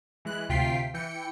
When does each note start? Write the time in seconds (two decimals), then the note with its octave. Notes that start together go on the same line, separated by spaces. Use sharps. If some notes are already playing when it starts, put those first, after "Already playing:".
0.25 E3 G#3 F#6
0.49 D2 C3 F4 G5 B6 C7
0.94 E3 G5 C#7